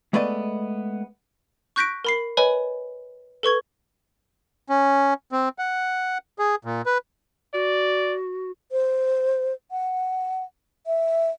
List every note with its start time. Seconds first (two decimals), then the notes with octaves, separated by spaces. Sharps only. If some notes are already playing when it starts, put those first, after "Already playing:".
0.13 G#3 A3 B3 B4 D5 D#5
1.76 C#6 F#6 G6 A#6 B6 D7
2.05 A#4 B5 C7
2.37 B4 C#5 D#5 G#5 B5
3.43 A4 B4 C#6 G#6
4.70 C#4
5.32 C4
5.59 F#5
6.39 G#4
6.65 A#2
6.86 B4
7.54 F#4 D5
8.72 C5
9.71 F#5
10.87 E5